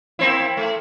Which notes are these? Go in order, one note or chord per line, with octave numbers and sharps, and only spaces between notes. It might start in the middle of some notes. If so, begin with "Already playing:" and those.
A#3 C4 E4
A3